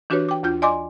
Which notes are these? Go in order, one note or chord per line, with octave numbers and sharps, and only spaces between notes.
E3 D4 F#4 G4 B4 C#5
G5 D6
D#2 D4 F4 G6
D5 D#5 G#5 C6 D6